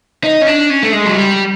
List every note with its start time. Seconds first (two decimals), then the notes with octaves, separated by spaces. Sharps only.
0.24 D#4
0.42 C#4
0.47 D4
0.70 C#4
0.83 A3
0.92 G#3
1.06 F#3
1.15 G3